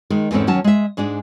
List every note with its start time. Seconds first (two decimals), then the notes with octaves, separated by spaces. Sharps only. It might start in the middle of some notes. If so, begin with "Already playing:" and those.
0.10 D#3 G#3
0.31 E2 G#2 G#3 C4 C#4 A4
0.47 D#2 F#3 C#4 A5
0.64 G#3 E5
0.97 G#2 G#3 D4 G#4